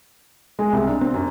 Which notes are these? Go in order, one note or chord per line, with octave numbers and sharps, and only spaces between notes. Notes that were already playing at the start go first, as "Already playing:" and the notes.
G#3
C2
D4
C4
F#2